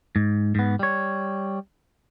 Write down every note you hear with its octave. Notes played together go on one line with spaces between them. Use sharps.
G#2
G#2 B3
G3 C#5